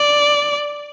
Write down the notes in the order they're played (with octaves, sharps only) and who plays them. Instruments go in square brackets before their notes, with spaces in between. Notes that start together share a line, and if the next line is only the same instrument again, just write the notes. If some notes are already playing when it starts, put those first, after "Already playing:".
Already playing: [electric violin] D5